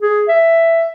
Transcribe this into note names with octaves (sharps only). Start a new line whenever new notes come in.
G#4
E5